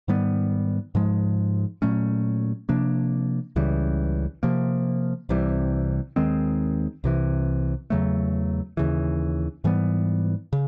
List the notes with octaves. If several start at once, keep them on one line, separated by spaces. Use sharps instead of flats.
G#2 D#3 G3 B3
G#2 F3 G#3
A#2 F#3 A3 C#4
C3 F3 A#3 D4
C#2 C#3 E3 G3
C3 F3 A#3
C2 C3 E3 G3
D#2 D#3 G#3 C4
C2 C3 E3
E2 C#3 F#3 A3
D#2 C#3 E3
G#2 E3 G3 B3
C#3